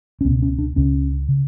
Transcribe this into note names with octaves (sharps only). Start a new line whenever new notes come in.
C#4
C#2 B2 B3
C#4
D4
C#2 C#3 C#4
C#3